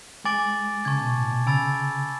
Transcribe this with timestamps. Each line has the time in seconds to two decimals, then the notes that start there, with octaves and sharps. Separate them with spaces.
0.24 G#3 G#5 D6 A6 D7 F#7
0.85 C#3 A5 C#6 G#6
1.01 B2
1.15 A2
1.31 B2
1.46 C#3 G#5 B5 E6 A6